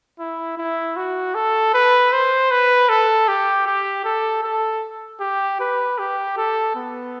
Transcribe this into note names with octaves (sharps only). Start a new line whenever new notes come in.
E4
E4
F#4
A4
B4
C5
B4
A4
G4
G4
A4
A4
G4
B4
G4
A4
B3